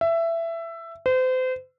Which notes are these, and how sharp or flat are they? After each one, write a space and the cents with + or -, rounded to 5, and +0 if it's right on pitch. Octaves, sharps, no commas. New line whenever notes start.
E5 +15
C5 -35